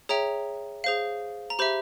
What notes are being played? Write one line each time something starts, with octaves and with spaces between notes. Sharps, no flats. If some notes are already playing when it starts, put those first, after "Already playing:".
G#4 C#5 E5 G5 A#5
G#4 C5 F5
A#5
G4 C5 E5 B5